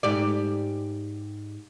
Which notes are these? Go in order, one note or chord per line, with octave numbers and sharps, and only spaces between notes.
G#2 G4 D5